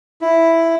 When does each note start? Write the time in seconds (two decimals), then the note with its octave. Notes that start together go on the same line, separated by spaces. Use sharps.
0.21 E4